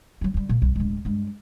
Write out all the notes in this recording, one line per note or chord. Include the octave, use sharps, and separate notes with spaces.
F#3 C4
D3 G3
A#2
C2 F2
D1 G#3
G2 G#3